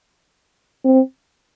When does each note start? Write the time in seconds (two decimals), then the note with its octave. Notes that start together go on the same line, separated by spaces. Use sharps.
0.85 C4